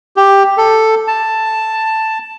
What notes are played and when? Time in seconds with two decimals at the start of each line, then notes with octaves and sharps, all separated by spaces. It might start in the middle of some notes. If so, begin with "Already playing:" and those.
0.17 G4
0.57 A4
1.08 A5